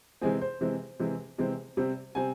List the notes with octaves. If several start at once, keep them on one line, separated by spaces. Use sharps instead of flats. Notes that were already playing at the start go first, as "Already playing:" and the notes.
C3 E3 G#3 C4 G#4
C5
C3 E3 G#3 C4
C3 E3 G#3 C4
C3 E3 G#3 C4
C3 G3 C4
C3 G3 C4 G#5